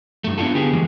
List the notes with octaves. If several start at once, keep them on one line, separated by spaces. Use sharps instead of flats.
G2 A3
B3 D4 E4 F4 A4
D3 B3 G4 G#4
G2 E3 G#3 A#3